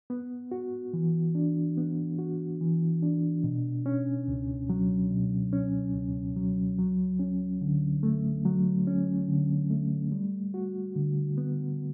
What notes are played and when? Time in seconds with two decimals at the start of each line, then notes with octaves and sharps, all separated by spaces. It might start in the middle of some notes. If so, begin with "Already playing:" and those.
0.10 B3
0.52 F#4
0.94 E3
1.35 D4
1.77 B3
2.19 F#4
2.61 E3
3.02 D4
3.44 B2
3.86 C#4
4.28 C#2
4.69 F#3
5.11 B2
5.53 C#4
5.95 C#2
6.36 F#3
6.78 F#3
7.19 C#4
7.61 D3
8.03 A3
8.45 F#3
8.87 C#4
9.28 D3
9.70 A3
10.12 G3
10.54 F#4
10.96 D3
11.38 B3